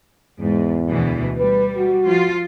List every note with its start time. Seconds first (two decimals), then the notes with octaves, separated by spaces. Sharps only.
0.40 E2 G#2
0.89 D2 B2 E3
1.38 G3 B4
1.77 F#4
2.06 F3 F4